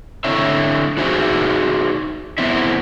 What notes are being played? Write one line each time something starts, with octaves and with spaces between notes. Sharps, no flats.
D3 C4 E4 C#5 E5
D#4 F#4 G#4 C5 E5
B3 C4 E4 E5